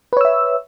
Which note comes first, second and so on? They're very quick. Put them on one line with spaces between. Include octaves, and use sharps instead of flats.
B4 C#5 E6 E5